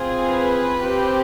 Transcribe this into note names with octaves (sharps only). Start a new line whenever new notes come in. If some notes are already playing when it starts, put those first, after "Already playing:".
Already playing: C4 F4 G#4
B4
C4 G4